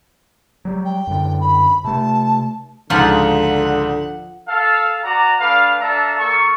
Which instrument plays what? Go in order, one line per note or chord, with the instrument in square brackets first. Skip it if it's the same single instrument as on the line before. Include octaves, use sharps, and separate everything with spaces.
[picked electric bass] F#3 G3
[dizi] G5
[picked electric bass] F#2 D3
[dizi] B5
[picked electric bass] C3 A3 [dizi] A5
[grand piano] C#2 G#2 [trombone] D3 [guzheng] F3 [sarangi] F#5
[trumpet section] A4 F5
F#4 D5 A#5
A3 D4 B4 F5
D4 A4 E5 F5 A5 A#5
A#3 A4 A#4 C#6